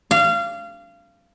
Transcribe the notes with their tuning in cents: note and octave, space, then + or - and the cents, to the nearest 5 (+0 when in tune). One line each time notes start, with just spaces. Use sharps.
F5 -25